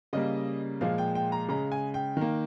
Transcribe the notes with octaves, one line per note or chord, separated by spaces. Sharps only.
C#3 G3 A#3 D#5
A#2 F3 G#3 F5
G5
G5
A#5
C#3 G#3 A#5
G#5
G5
D#3 A#3